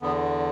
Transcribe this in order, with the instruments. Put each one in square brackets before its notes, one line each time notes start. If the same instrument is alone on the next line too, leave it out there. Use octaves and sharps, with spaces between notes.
[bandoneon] E2 D3 B3